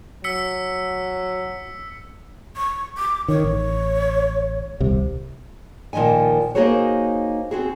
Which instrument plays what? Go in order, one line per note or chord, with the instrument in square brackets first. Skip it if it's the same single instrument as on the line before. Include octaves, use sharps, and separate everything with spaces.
[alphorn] F#3 [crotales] E6 B6 C#7
[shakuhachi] C#6
D6
[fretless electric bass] D#3 [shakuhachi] C#5
[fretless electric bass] A1
D#1 C2 C3
[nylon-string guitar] A#2 D#3 F3 D#5 G#5
A#3 D#4 F#4 G#4 C5 C#5
C4 F#4 G#4